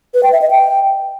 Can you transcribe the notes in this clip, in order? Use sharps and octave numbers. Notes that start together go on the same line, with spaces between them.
B4
G5
E5
D#5
G5